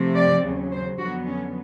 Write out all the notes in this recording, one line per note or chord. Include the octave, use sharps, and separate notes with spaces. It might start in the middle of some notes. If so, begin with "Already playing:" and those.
Already playing: C3 F3 A3 C4
D5
D#2 C#3 F#3
C5
F2 D3 F#3 B3 F#4
C#4